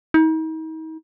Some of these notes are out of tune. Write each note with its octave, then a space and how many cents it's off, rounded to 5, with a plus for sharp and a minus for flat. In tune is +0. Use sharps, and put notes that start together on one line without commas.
D#4 +40